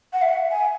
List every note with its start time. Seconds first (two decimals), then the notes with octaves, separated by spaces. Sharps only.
0.13 F#5
0.22 E5
0.29 F#5
0.51 G#5